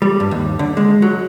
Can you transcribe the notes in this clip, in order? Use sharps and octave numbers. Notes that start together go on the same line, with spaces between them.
G3
G2
D#2
D3
G#3
F#3